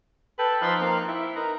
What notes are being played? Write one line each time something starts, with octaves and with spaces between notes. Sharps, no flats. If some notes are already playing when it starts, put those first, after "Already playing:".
A4 B4 G5 A5
F3 D#4 A5 B5 C6 F6 F#6
A#3 C4 F5
E4 E5 G5
D#4 A#4 B4 A#5